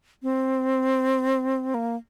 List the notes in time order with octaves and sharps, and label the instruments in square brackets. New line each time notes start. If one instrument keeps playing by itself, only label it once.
[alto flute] C4
A#3